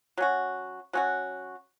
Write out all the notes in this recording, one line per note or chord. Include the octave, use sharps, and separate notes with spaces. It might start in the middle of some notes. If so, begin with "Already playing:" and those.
F#3 C#4 F#4
F#3 C#4 F#4